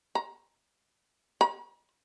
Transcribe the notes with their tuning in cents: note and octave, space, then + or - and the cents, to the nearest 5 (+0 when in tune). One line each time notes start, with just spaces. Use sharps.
A#5 +20
A#5 +45